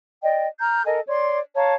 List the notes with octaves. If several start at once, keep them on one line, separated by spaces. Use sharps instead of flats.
D5 D#5 G5
A#5 F6 G6
A4 A#4 D#5 G#5
C#5 D5 C6
C#5 F5 A5 A#5